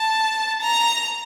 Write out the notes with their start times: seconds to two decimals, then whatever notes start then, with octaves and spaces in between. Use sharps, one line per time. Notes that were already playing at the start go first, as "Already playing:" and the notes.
Already playing: A5
0.61 A#5